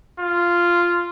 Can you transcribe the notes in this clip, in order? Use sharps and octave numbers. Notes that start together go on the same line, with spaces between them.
F4